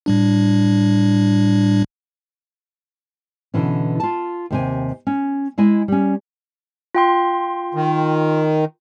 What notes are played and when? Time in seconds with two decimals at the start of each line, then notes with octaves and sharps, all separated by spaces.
0.06 A2 G3 D4
3.54 B2 D3 E3 C#4
4.00 F4 A5
4.50 D#2 C3 G#5
5.07 C#4
5.58 G#3 E4 D#5 G#5
5.88 G3 C#4
6.95 F4 G5 C6
7.74 D#3